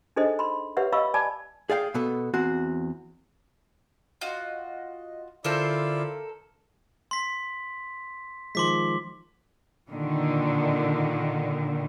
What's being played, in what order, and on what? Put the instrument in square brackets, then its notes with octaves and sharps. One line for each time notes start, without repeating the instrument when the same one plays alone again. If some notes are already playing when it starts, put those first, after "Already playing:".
[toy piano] D4 D#4 G#4 A4 C5 D#5
B5 C6
G4 B4 C#5 E5 F#5
D#5 F5 B5 C#6 E6
D5 G#5 A5 B5 D6
[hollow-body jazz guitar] G#4 D5 F5 G5
B2 B3 A4
E2 C4 F#4
[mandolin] F4 F#4 [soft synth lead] D#5
[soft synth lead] D3 [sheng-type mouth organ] E4 F4 D5 [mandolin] A4 A#4 C5
[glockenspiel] C6 B6
[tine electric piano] D#3 F3 G#3 [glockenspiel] C6 D6 B6
[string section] A#2 D3 D#3